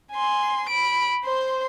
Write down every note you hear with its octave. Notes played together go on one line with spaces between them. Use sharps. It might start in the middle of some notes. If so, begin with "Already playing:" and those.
G#5 C6
B5 D7
C5 C6